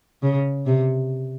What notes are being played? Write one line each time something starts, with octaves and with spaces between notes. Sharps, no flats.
C#3
C3